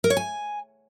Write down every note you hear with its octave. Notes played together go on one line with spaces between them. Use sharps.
A#4
C#5
G#5